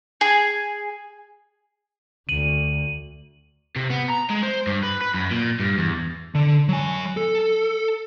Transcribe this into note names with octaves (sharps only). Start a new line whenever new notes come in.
G#4
D2 D#7 F#7
C3
B3
A#5
G#3
C5
G2
B4
B4
F#2
A#2
G2
E2
D3
F#3 G#5
A4